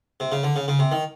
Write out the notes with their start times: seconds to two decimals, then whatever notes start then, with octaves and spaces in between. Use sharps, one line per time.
0.20 C3
0.32 C#3
0.43 D3
0.56 C#3
0.68 C#3
0.79 C3
0.92 D#3